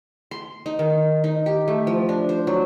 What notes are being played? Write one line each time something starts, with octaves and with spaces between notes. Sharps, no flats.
C6
D#4
D#3
D#4
G4
A3
F3
D4
C5
F#3